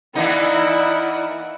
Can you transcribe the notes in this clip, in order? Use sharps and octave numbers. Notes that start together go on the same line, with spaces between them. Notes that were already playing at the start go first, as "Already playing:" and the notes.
E3 A#3 D#4 E4 D5 F#5